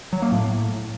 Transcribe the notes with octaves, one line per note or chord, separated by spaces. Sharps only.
F#3
A#3
A2